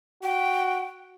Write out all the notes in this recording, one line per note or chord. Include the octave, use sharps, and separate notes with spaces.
F#4 G5